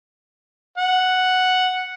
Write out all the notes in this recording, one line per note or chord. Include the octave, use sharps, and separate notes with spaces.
F#5